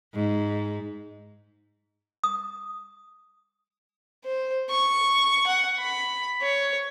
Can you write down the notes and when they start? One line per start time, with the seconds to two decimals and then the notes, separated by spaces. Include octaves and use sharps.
0.14 G#2
2.24 D#6
4.25 C5
4.70 C#6
5.47 F#5
5.79 B5
6.42 C#5